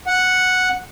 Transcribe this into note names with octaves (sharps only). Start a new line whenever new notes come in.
F#5